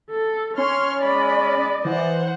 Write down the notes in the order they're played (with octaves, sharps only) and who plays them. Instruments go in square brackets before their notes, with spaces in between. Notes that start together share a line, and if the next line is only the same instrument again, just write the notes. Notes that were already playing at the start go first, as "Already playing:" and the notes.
[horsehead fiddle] A4
[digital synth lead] C#4 [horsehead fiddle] C#5 [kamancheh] C6 F6
[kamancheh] G#3 B5 [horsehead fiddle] D5 D#5
[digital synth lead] E3 [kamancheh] C5 F#5